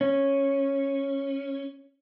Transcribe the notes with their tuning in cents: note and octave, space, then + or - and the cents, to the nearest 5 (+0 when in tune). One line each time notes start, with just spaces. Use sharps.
C#4 -10